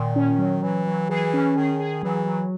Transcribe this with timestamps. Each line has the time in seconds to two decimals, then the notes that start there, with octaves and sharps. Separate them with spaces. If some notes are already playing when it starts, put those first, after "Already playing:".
Already playing: A#2 D#3
0.16 C#4
0.39 F#3
0.62 E3 F#3
0.87 F#3
1.09 E3 G#4
1.34 C#4
1.56 D#3 G#4
1.80 G#4
2.03 E3 F#3
2.26 F#3